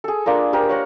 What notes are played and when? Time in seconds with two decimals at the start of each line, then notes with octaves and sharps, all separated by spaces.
0.04 G#4 A4
0.26 A#3 D4 F4 A#4
0.53 G4 A#4 C5
0.69 C#5 F#5 A#5